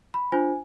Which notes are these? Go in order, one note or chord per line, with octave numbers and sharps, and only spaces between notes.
B5
D4 F4 C5 G#5